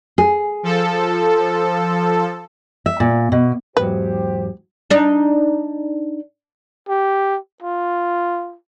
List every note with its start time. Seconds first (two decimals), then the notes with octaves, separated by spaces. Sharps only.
0.18 G#4
0.63 F3 A4
2.86 E5
3.00 A#2
3.32 B2
3.77 E2 G#2 F#3 G4 B4 C5
4.90 D4 D#4
6.88 G4
7.62 F4